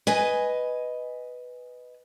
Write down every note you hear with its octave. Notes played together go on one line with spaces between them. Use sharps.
B4 D#5 G#5